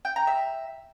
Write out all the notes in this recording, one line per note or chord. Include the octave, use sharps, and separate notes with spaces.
G5
A#5
E5